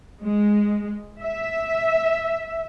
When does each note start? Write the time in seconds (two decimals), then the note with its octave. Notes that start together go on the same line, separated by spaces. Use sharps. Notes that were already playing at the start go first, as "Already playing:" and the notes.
0.24 G#3
1.22 E5